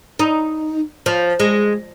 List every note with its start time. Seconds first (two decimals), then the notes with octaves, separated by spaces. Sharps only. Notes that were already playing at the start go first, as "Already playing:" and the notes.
0.19 D#4
1.06 F3
1.40 G#3